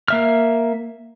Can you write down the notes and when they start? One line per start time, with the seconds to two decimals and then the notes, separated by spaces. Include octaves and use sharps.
0.08 A#3 E5 F6